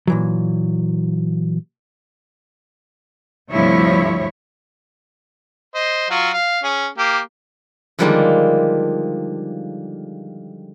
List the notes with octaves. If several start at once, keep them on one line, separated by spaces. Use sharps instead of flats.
A#2 E3 F#3
D2 G2 C3 F3 E4 C#5
C5 D#5
F#3 F4 F#4
F5
C#4 G#4
A#3 G4
D3 D#3 F3 G3 G#3 A#3